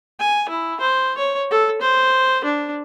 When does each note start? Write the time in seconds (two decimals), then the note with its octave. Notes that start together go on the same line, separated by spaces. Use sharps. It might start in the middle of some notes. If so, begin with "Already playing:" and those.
0.20 G#5
0.49 E4
0.81 C5
1.18 C#5
1.51 A4
1.82 C5
2.44 D4